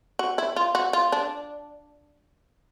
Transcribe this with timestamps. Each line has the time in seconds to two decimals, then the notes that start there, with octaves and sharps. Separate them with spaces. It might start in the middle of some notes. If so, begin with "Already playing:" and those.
0.19 F#4
0.38 E4
0.56 F4
0.75 F#4
0.93 F4
1.12 D4